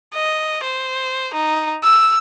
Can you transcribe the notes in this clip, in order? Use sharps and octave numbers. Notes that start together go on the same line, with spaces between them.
D#5
C5
D#4
E6